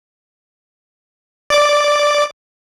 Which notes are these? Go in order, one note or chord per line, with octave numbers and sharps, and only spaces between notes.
D5 D6